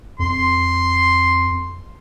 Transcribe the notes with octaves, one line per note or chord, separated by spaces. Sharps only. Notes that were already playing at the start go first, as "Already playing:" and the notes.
F2 C6